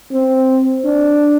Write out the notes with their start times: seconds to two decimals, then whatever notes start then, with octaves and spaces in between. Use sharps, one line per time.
0.13 C4
0.85 D4